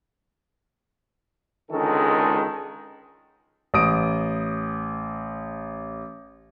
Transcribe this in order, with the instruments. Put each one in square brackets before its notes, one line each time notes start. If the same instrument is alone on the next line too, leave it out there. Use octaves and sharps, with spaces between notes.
[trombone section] C#2 D3 D#3 G#3 A4
[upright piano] A1 D#6 D7